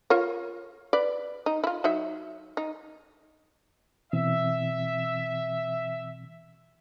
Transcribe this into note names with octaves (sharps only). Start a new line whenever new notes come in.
F4 A#4 C#5
B4 D5
D#4
E4 F4
F#3 D#4 E5
D#4
B2 E3 C4 E5